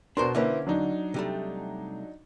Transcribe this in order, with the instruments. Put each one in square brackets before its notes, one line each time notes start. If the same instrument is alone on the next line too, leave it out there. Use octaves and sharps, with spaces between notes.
[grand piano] B2 C6 [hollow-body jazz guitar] D4 A#4 C5
[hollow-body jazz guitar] D3 A#3 C#4 [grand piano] E4 B4 C5
[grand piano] F#3 D4 D#4
[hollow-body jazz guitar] C3 G3 A3